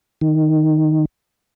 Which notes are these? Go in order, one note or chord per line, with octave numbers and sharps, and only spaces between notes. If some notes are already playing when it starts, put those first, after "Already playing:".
D#3